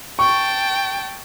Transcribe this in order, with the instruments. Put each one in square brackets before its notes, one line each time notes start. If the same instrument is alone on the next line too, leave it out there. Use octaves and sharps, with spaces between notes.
[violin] G5 A5 [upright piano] C#6